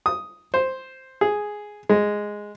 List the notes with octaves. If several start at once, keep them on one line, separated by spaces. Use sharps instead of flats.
D#6
C5
G#4
G#3